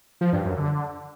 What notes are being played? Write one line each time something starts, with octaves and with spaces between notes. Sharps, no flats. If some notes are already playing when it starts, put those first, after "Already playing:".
F3
G2
F#2
D3